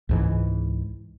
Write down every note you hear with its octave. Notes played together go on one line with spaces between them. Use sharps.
C#2 G#2 E3